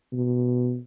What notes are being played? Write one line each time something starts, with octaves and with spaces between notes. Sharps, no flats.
B2